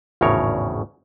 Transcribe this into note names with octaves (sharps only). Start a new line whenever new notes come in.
G#1 E2 A2 C#3 A#4 C#5